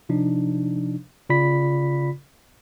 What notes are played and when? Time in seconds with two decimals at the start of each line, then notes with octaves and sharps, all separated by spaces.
0.09 C3 F3 D4 D#4
1.30 C#3 F4 D5 B5 B6